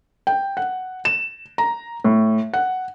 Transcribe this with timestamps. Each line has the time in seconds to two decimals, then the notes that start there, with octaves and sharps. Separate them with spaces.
0.27 G5
0.57 F#5
1.05 E7
1.58 A#5
2.04 A2
2.54 F#5